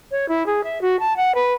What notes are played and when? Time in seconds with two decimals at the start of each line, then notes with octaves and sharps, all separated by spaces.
0.11 C#5
0.29 E4
0.46 G#4
0.64 E5
0.81 F#4
0.99 A5
1.17 F#5
1.35 B4